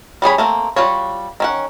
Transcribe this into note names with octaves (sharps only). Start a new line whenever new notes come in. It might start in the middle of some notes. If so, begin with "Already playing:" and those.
G3 C#4 G#4 B5
A3 A#3 C4
G3 F4 F#4 C#5
D#3 C#4 F#5